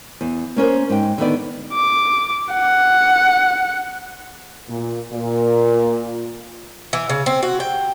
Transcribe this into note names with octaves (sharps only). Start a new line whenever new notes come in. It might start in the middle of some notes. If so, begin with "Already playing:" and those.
E2
A#3 C#4 A#4 C5
G#2 G5
D3 D#3 B3 D5
D6
F#5
A#2
A#2
E3
C#3
C4
F#4
G5